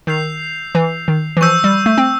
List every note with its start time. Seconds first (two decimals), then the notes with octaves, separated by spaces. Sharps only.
0.07 D#3 E6 G6 C7 F7
0.75 E3
1.08 D#3
1.37 E3
1.41 F3 C#6 E6 G6
1.64 G3
1.86 A3
1.98 C4